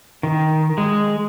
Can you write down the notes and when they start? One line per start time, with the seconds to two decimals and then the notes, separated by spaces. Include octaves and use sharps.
0.23 D#3
0.78 G#3